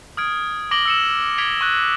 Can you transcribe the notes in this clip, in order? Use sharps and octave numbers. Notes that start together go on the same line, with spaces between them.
D#6 F6 G#6 D7
D6 A#6 D7 F#7 G7
E6 C#7 E7
G#6 B6 C#7 D7 F7 G7
C#6 F#6